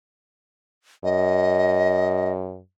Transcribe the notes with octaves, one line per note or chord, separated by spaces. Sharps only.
F#2 D#5